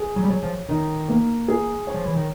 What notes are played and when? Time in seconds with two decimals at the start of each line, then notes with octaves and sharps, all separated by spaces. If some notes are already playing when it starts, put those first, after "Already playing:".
Already playing: G#4
0.16 F#3
0.24 G3
0.29 F#3 C#5
0.43 F3
0.69 D#3 D#4
1.09 A#3
1.48 G#4
1.87 C#5
1.94 F3
2.06 E3
2.16 D#3